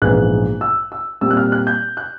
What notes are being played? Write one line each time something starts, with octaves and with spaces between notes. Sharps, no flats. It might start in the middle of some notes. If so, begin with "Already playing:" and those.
A#1 G#2 E3 G#3 B3 F#6
E6
E6
A#2 G3 C4 E6
F#6
F6
F#6
G6
F#6